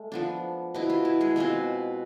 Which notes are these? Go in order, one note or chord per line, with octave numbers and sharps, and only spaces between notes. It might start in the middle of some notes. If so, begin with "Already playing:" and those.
Already playing: G#3 A3
F3 B3 D4
B2 B3 E4
F4
E4
G#3 G#4
B2 G#3 C4 F4